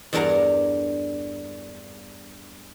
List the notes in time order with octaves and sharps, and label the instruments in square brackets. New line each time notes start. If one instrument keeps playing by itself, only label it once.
[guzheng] E2 G2 D4 A#4 F#5 A#5